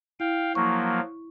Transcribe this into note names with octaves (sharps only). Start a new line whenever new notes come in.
E4 F5 G5
F3 F#3 A#3 C#6